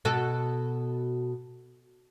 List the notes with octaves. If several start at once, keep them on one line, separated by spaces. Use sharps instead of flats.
B2 F#4 A4